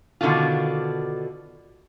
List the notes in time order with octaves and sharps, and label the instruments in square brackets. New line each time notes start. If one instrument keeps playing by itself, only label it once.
[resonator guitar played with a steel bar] B2 D3 D#3 D4 F4